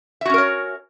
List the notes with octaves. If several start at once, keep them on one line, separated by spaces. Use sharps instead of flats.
C#4 F#4 A#4 C#5 E5